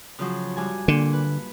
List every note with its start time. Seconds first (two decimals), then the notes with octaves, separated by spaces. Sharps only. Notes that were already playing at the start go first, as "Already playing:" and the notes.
0.19 C#3 F3 F#3
0.57 G2 G#5
0.88 A#2 D3
1.13 B4